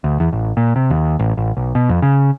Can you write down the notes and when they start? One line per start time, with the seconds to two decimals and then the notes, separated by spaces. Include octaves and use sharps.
0.04 D2
0.20 E2
0.33 A1
0.57 A#2
0.76 C3
0.90 D#2
1.19 A1
1.37 A1
1.57 B1
1.75 B2
1.89 F2
2.02 C#3